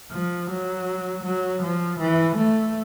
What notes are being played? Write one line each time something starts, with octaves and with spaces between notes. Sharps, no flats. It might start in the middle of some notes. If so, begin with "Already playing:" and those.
F3
F#3
F#3
F3
E3
A3